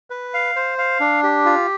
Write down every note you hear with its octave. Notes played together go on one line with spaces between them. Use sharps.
B4
F5
C5
F5
D4
G4
F4